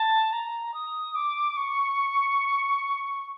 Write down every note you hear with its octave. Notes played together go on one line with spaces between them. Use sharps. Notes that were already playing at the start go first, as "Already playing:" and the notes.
Already playing: A5
A#5
D#6
D6
C#6